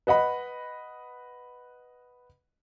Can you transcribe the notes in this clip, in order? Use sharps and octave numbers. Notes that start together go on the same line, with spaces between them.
B4 D#5 F#5 B5